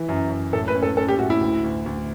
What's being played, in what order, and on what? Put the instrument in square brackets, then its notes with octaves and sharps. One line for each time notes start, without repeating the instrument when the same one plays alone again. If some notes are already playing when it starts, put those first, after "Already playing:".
Already playing: [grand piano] E3 E4
F#2
F#2
[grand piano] A2 [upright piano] A4
[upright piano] B4
[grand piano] C#4
[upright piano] A4
[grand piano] C#4 [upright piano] A4
[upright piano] G4
[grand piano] A2 [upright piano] F#4
[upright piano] E4
[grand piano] D2
D2
D2